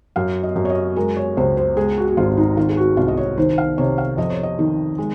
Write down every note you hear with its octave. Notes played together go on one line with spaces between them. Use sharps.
F#2 F5
D#5
F#2
C#5
D#5
G#3 A#4
C#5
C#2 C5
C5
G#3 G#4
F#4
F#4
G#1 F4
D#4
D#3 F4
G#4
F#4
C2 F4
D#5
C#5
D#3 C5
F5
C3 C#5
F5
F2 D#5
C#5
D#5
D#3
G#3